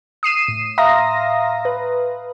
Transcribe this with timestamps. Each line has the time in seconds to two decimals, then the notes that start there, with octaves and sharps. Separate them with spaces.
0.23 D#6 C7 D#7 E7
0.48 A2
0.78 E5 F5 A#5 C6 D#6 A#6
1.65 B4